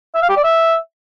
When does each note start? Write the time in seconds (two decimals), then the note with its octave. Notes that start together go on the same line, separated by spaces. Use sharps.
0.15 E5
0.22 F5
0.29 G4
0.37 D5
0.44 E5